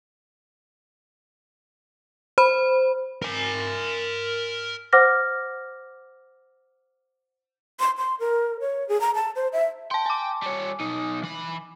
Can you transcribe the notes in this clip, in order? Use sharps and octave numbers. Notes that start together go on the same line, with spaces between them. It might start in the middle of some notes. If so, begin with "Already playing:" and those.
C5 B5
A#4 G#5
C5 F#5 D6 F6 A#6
C6
C6
A#4
C#5
G#4
A#5
A5
C5
E5
G5 A5 C6
G#5 D6
G3 C#5
B1 D#4
E3 B5